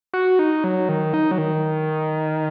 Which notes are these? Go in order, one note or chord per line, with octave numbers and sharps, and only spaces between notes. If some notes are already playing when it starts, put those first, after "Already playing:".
F#4
D#4
F#3
D#3
D#4
F#3
D#3